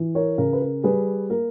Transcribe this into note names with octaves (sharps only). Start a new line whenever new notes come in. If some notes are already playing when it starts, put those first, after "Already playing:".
Already playing: E3
A#4 C#5
C#3 A#4
B4
A#4
G3 G#4 B4
A#3 A#4